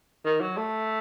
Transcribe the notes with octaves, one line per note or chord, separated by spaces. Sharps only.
D#3
F#3
A3